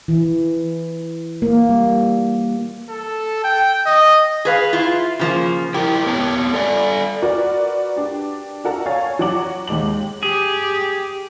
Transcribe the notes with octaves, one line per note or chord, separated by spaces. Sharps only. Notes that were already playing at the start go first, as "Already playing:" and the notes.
E3
A#3
G3
A4
G5
D#5
G#4 B4 F5
E4 F4
C#3 F3 A#3
E4 G4 A#4
B3 C#5 A5
A4 D5 G#5
F#4 A#4 B4 D5
D4 G4
F#4 A4 A#4 F#5 A5 A#5
C#5 F5 G#5 A#5 A6
F#3 F#4 C#5 F#5 D6 F#7
D#2 G#3 D6 F#7
G4 G#4